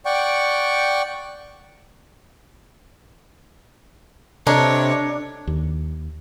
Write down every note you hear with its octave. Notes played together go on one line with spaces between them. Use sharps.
D5 F#5 G5 C#6
C3 D4 A4 C#5 D#5 A#5
D#2